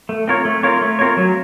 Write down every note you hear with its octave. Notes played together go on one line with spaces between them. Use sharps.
A3
C4 F4 A#4 C#5
A3
C4 F4 A#4 C#5
A3
C4 F4 A#4 C#5
F#3